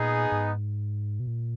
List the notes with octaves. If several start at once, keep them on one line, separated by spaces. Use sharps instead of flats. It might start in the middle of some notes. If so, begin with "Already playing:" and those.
Already playing: A#2 B3 D#4 G#4
G#2
B2
A#2